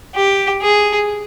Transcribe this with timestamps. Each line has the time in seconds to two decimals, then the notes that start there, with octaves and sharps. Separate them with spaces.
0.15 G4
0.62 G#4